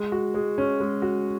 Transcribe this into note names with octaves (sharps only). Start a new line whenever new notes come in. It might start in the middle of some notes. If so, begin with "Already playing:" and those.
Already playing: G#3
F#4
G#3
C#4
G#3
F#4